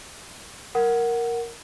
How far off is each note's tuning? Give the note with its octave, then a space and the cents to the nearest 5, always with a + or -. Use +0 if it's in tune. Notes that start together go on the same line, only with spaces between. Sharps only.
A#4 +0 F#5 +0